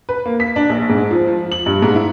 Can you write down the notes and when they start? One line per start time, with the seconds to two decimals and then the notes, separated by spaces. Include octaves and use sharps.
0.09 B4
0.26 A#3
0.40 B6
0.56 D4
0.70 A#1
0.90 G#2
1.11 F3
1.27 F3
1.52 F#7
1.66 G2
1.82 G#2
1.95 E4